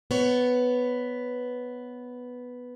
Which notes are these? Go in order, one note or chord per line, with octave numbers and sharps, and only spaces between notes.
B3 C#5